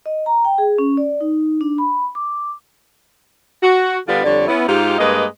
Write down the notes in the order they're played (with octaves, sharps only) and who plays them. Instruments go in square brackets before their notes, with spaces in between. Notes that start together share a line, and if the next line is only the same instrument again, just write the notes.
[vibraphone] D#5
A#5
G5
G#4
C#4
D5
D#4
D4
B5
D6
[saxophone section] F#4
D3 G3 B3 D4 F4
F2 D3 G3 D4 C#5 D5
B3 C#4 E4
G#2 D#4 F4 G4
G2 G#3 A#3 B4 D#5